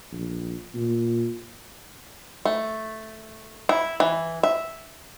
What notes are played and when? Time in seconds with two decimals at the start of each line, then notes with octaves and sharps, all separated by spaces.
0.12 A#1
0.74 A#2
2.45 A3
3.69 E4
4.00 E3
4.43 E5